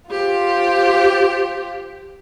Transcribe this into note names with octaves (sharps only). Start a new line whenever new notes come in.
F4 G4 C5